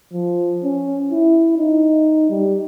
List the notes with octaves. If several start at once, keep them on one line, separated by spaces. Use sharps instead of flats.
F3
C#4
E4
D#4
G3